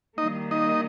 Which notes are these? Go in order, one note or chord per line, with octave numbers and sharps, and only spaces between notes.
D#3 G3 A#3 D#4 D#5
D#4 D#5